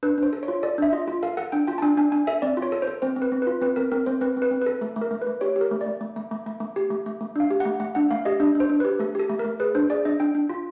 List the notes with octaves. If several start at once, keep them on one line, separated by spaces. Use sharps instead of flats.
D4 B4
D4 C5
A4
C#5
F4
A4 D5
D4 E5
F4 D#5
F4
A4 F5
A4 F#5
D4 G5
F4 G5
A5
D4 G#5
D4 G#5
D4 G#5
A4 E5
C4 D5
F4
C#5
A4
C5
A4
C4 C5
C4
B4
C4
B4
F4
C4 B4
C4 A#4
C4 A#4
C4 C5
C4 B4
C4 B4
C4
B4
A4
A3 A4
A3
A#4
A3
B4
A3
G4 C#5
G4
A#4
A3
D5
A3
A3
A3
A3
A3
A3
G4
A3
A3
A3
D4 F5
G4
F#5
A3
A3 F#5
D4 F#5
A3 F5
G4 D#5
D4 D#5
D4 C5
D4
B4
G4
A3 A4
G4 A4
A3
A#4
A3
G#4 B4
D4 C5
G#4 D5
D4 D#5
D4 G5
D4
F4